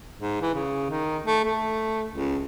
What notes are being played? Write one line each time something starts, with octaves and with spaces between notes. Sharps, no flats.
G#2
E3
C#3
D#3
A3
A3
C#2